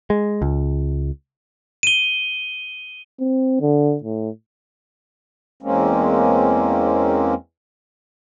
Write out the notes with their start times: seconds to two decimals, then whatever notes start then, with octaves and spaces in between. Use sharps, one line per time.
0.10 G#3
0.42 C#2
1.83 D#7 G7
3.20 C4
3.61 D3
4.03 A2
5.63 E2 G#3 A#3 C4 C#4